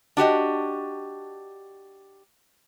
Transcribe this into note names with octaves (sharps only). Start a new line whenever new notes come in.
D4 F#4 G4 D#5